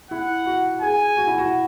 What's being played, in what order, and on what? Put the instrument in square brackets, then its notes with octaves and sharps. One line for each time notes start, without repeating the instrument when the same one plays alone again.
[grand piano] E4 [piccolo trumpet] F#5
[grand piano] F#4
[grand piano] G#4 [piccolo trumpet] G#5
[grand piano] F#4
E4
F#4